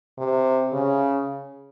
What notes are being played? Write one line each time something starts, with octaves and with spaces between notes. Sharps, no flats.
C3
C#3